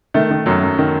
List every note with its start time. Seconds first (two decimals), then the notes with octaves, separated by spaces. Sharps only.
0.14 D#3 A3
0.31 D#3
0.46 F#2 F#3
0.63 F#2
0.78 D#3